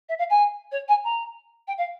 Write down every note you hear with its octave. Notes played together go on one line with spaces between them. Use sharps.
E5
F5
G#5
C#5
G#5
A#5
G5
F5